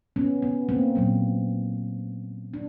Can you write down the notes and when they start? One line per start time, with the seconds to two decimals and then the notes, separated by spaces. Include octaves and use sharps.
0.16 B3 C#4
0.42 B3
0.69 A#3 C4
0.95 A#2 F#3 A#3
2.54 D4